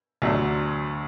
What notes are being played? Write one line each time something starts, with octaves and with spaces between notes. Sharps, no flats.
D2 D3 F#3 A3 D4